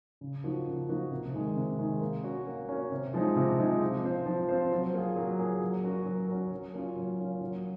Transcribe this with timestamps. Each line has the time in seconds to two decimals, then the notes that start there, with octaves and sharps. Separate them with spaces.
0.21 C#3
0.44 F3 A#3 D#4 F#4
0.66 C#3
0.88 F3 A#3 D#4 F#4
1.11 C3
1.34 D#3 G#3
1.57 C3
1.79 D#3 G#3
2.01 A#3
2.24 C#4 F#4
2.47 A#3
2.69 C#4 F#4
2.91 C3
3.14 F3 G#3 D#4
3.36 C3
3.59 F3 G#3 D#4
3.81 F3
4.04 C4 F4 C5
4.26 F3
4.49 C4 F4 C5
4.71 F#3
4.93 A#3 F4 G#4
5.16 F#3
5.39 A#3 F4 G#4
5.61 F#3
5.84 C#4 F#4 A#4
6.06 F#3
6.28 C#4 F#4 A#4
6.51 F#3
6.73 A#3 C#4 F4
6.96 F#3
7.18 A#3 C#4 F4
7.41 F#3